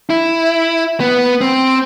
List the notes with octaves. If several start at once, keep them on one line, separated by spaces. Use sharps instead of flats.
E4
B3
C4